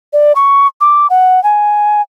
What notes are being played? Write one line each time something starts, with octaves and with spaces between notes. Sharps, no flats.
D5
C#6
D6
F#5
G#5